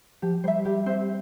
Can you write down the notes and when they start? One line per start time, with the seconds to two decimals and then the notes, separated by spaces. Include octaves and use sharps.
0.22 F3 G4
0.44 G3 C5
0.48 E5
0.65 G3 G4
0.86 C4 C5 E5